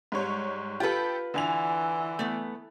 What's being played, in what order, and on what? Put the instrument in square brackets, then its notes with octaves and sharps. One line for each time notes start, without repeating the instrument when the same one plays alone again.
[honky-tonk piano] G#2 G3 C#5
[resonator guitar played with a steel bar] F4 B4 [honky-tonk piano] G4 A4
[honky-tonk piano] D3 G#5 F7 [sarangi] E3
[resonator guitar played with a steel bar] A3 B3